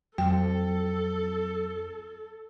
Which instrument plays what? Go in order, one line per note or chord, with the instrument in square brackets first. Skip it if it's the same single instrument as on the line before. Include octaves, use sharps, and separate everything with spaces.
[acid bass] F2 [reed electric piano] F#3 [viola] A4 [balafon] G5